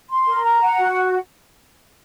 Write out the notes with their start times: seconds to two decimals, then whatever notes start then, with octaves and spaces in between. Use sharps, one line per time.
0.11 C6
0.27 A#4
0.44 A#5
0.62 F#5
0.78 F#4